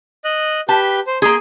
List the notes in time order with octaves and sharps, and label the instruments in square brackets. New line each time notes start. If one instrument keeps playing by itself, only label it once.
[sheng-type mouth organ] D#5 F#6
[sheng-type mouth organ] G4 B4 G6 [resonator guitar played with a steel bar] A5
[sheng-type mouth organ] C5
[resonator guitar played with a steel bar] A#3 G#4 [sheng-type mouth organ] C6